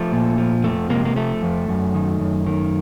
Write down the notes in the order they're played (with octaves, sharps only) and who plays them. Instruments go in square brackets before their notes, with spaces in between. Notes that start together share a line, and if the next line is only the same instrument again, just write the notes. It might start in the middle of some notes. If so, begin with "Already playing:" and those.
Already playing: [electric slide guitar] F3 A3
A#2
F3
F2 A3
C3 G#3 A#3
A#3
F3 A3
F2
F#2
D#3
F#2
D#3